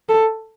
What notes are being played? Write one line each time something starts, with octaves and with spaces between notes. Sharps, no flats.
A4